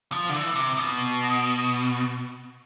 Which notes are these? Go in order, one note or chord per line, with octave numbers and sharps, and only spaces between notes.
F3
D3
E3
C3
B2